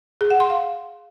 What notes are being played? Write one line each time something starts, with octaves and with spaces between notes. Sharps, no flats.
G#4
F#5
C6
F5